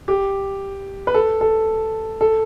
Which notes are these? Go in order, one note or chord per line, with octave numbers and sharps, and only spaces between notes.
G4
B4
A4
A4
A4